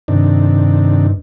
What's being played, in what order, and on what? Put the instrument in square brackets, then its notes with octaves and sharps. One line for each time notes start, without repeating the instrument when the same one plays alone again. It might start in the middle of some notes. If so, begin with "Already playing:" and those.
[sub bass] G2 [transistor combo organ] C3 D#3 D4